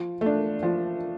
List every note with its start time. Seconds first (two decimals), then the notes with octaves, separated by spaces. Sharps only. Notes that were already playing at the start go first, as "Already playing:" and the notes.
Already playing: F3
0.21 A3 D4
0.63 F3